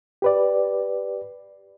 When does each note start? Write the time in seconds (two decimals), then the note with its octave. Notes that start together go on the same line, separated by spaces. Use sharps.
0.22 G4 B4 D5